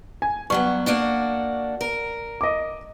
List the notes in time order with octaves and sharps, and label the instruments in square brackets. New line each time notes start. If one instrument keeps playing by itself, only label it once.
[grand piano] G#5
[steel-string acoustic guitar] G2 F#3 B3 [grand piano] C#6
[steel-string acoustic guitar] A#3 D4 F#4
A#4
[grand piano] D#5 D6